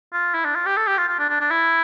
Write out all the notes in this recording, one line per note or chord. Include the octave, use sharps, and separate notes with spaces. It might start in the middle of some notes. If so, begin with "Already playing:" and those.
F4
E4
D4
F4
G4
A4
G4
F4
F4
D4
D4
D4
E4